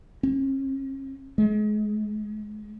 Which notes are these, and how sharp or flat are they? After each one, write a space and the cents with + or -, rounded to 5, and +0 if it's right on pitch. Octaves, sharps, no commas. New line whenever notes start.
C#4 -45
G#3 +30